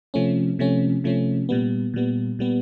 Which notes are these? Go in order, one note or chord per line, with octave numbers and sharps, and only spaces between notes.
C3 F3 A3 C#4
C3 F3 A3 C#4
C3 F3 A3 C#4
A#2 G3 B3
A#2 G3 B3
A#2 G3 B3